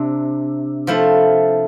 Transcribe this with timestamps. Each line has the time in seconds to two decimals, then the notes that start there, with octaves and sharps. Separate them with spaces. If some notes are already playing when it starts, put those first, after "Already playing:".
Already playing: C3 D4
0.87 F3 A3 E4